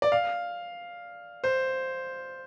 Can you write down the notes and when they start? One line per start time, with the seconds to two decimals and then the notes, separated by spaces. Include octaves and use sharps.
0.02 D5
0.12 F5
1.44 C5